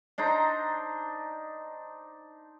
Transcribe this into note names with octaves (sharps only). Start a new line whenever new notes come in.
D4 D#4 C5 A#5